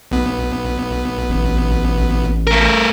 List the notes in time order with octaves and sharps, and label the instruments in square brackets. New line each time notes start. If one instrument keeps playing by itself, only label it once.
[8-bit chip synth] B1 B3
[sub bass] A1
[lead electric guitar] A3 A#4